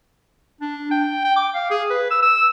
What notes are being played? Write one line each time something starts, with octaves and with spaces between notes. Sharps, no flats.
D4
G5
G5
D6
F5
G#4
B4
E6
E6